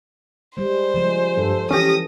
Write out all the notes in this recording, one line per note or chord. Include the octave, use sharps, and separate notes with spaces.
G3 G#3 C5
C#3 F3 G#3
G2 A4
E3 C#4 G4 D#6 A#6